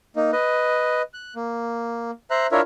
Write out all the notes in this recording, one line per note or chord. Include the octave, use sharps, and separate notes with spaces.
A#3 D#4
B4 D#5
F#6
A#3
C5 E5 A#5 F#6
D4 E4 F4 A#4 C#5 E5